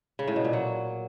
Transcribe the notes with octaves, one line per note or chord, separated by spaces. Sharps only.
C#3
A2
B2
A#2
F#3